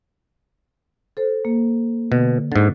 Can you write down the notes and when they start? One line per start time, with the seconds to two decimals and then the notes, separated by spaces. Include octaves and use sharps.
1.17 A4 C5
1.45 A#3
2.12 B2 D3
2.52 G#2 D3 A6